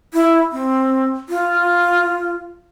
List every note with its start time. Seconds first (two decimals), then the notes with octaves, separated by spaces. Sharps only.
0.14 E4
0.52 C4
1.29 F4